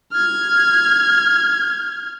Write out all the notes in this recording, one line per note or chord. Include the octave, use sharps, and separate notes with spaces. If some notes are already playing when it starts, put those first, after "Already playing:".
F6 G#6